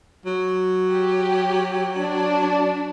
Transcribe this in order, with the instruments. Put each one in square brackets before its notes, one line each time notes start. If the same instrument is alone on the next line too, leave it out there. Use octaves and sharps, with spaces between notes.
[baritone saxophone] F#3
[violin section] G4
D4